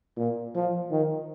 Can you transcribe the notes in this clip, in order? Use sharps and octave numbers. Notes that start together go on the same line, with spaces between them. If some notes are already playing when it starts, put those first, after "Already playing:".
A#2
F3
D#3